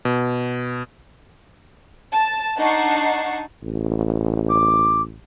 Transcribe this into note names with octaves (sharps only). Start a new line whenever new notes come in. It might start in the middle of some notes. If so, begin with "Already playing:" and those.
B2
A5
D4 D#4 F#5 A5 C#6 C7
A1
D6